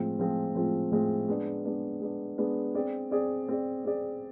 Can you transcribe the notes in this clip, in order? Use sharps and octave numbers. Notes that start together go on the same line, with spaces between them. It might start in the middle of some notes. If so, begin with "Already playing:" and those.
Already playing: A2 F3 G#3 C4 F4
A2 F3 G#3 C4 F4
A2 F3 G#3 C4 F4
A2 F3 G#3 C4 F4
G#3 B3 D4
G#3 B3 D4
G#3 B3 D4
G#3 B3 D4
C4 G#4 D5
C4 G#4 D5
C4 G#4 D5
C4 G#4 D5